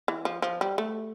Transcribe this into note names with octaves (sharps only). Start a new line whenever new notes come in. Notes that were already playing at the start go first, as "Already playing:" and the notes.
E3
F3
F3
G3
A3